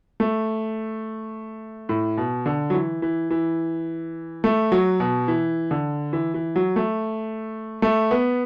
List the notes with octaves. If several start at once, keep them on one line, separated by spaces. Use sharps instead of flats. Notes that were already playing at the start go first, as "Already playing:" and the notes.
A3
A2
B2
D3
F#3
E3
E3
E3
A3
F#3
B2
E3
D3
E3
E3
F#3
A3
A3
B3